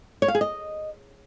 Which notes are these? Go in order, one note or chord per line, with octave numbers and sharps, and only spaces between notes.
C#5
F5
G#4
D#5